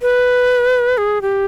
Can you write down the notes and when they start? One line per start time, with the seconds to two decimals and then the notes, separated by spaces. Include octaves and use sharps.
0.02 B4
0.98 G#4
1.22 G4